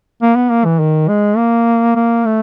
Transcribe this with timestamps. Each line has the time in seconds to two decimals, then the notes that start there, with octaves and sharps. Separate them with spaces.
0.22 A#3
0.36 B3
0.50 A#3
0.65 E3
0.80 D#3
1.08 G#3
1.37 A#3
1.96 A#3
2.25 A3